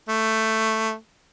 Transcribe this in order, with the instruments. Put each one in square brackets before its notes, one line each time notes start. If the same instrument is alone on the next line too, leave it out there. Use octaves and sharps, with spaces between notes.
[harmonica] A3